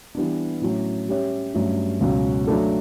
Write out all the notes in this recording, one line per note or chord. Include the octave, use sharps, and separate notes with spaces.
E3 G3 B3 D4
A2 F#3 A3 C#4
G3 C#4 G4 C#5 E5
G2 F#3 A3 C#4
C#2 B2 F#3 C#4
F#3 A3 D4 A4